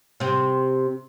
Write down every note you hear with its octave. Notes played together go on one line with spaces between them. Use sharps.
C3 C4